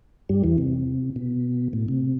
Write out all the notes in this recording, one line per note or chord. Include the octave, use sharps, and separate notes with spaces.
G2 G3
E2 E3
C3
B2
A2
C3